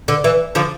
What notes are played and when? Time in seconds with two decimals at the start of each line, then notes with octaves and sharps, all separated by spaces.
0.08 D3
0.24 E3
0.55 D3 F3